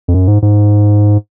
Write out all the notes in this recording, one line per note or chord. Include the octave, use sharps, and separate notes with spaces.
F2
F#2
G#2
G#2